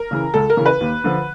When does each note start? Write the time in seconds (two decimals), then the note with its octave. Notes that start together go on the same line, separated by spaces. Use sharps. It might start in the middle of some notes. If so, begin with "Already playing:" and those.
Already playing: A#4
0.11 C#3 E3
0.34 C#2 A4
0.50 A#4
0.57 C#3 E3
0.66 B4
0.81 D#2
1.04 D3 F3